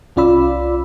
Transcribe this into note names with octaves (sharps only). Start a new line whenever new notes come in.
C2 C#4 F4 D5 B5 E6